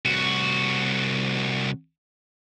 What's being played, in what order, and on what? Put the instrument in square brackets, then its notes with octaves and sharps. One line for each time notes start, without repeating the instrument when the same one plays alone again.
[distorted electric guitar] C2 F#4